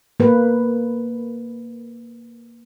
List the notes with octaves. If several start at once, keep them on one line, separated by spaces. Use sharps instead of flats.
A#3 B4